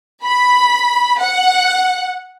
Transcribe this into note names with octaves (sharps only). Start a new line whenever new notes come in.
B5
F#5